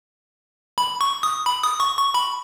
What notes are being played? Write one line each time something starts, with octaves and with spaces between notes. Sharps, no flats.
B5
C#6
D#6
B5
D#6
C#6
C#6
B5